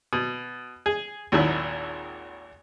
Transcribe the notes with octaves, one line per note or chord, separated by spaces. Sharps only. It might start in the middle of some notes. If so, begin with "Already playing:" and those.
B2
G#4
G#1 D#2 A#2 D#3 F#3 E4